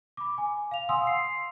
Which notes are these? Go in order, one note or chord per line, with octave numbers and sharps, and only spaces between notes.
B5 D6
G#5
F5 F7
F5 F#5 G#5 C6 D#6 E6
C7